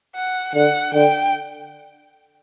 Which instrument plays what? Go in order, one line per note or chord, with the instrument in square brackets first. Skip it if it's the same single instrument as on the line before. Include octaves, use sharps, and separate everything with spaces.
[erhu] F#5
[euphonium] D3 [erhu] F#5
[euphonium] D3 [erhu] G5